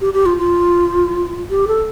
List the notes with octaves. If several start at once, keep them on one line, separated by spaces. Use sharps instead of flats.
G4
G4
F4
F4
G4
A4